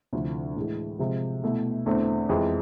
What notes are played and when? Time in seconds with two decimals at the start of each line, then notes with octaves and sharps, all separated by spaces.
0.13 D2 C3 F3 A3 E4
0.56 A2 E3 G#3
0.99 C3 F3 G#3
1.43 B2 A3 E4
1.86 E2 D3 A3 C4 E4
2.29 F2 E3 G#3